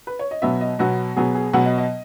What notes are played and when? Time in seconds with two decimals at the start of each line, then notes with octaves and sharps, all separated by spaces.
0.07 B4
0.19 C#5
0.31 D#5
0.42 B2 F#3 B3 E5
0.61 D#5
0.79 B2 F#3 B3 F#4
1.16 B2 F#3 B3 G#4
1.35 G#4
1.53 B2 F#3 B3 F#5
1.65 D#5
1.78 D#5